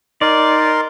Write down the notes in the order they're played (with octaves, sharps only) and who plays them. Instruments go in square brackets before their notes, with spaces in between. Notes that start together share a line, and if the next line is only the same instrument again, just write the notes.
[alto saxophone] D#4 [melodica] A#4 C6 [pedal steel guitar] D5